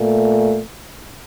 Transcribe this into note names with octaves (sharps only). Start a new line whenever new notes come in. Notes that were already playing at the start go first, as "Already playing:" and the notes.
Already playing: A#2 A3